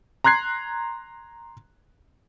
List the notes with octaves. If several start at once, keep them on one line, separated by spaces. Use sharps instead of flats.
A#5 C6 F#6 G#6 C7